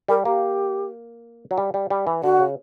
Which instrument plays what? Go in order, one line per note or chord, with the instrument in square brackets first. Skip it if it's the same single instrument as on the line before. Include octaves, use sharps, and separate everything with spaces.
[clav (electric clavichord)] G3 [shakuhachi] A#4
[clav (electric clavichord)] A#3 [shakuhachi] G4
[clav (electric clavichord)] F#3
G3
G3
G3
E3
[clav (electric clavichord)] D3 [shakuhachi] F#4
[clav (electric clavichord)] C#3